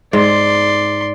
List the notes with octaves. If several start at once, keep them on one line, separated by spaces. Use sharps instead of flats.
G#2 D5 C6